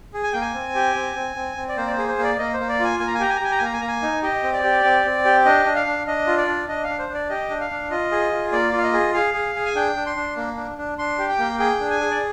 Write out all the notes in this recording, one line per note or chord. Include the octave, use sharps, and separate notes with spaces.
G#4
G#5
A#3 G5
G#5
C4
G4
C4
C4
C4
C4
D5
A#3 C5
D5
C5
G#4
C5
A#3
D5
A#3 D#5
C5
A#3
D5
F4 G#5
A#3 G#5
A#5
G#5
G4 A#5
G#5
A#5
G4 G#5
A#5
G#5
A#3 A#5
G#5
A#3 A#5
G#5
D#4
G4 D#5
C4
D5
G4
C4
C4
G4
D4 D#5
D4
F5
D4
D4 D#5
F4
D5
D4
D4 D#5
F5
D4
C5
D4
D5
G4 D#5
D4
F5
D4
F4 D#5
G#4
F4
A#3 D5
F4
F5
D#5
G#4
G#4 F5
G#4
G#4
G#5
D4 G5
D4
C6
D4
A#3
D4
D4
D4 C6
G4
G5
A#3
G#4 G5
D4
G#5
G#4
D5